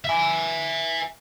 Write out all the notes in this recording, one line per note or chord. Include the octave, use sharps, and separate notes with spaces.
E5 G#5